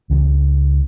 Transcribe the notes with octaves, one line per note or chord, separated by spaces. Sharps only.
C#2 C#3 F3 G3